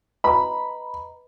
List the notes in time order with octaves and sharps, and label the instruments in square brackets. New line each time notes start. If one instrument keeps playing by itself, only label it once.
[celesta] B4 D#5 A#5 [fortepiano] B5